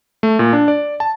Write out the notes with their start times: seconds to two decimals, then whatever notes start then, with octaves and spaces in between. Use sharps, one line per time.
0.23 A3
0.39 A#2
0.53 D4
0.68 D5
1.00 A5